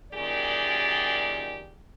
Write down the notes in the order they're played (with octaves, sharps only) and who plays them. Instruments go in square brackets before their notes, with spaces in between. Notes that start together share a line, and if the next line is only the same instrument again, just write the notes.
[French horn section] F#2 A#2 D#3 G4 G#4 D5